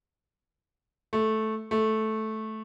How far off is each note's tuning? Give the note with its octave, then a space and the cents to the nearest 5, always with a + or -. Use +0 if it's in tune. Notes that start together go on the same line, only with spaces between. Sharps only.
A3 -10
A3 -10